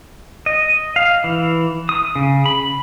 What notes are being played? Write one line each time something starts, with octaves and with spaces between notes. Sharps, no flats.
D#5
F5
E3
D#6
C#3
B5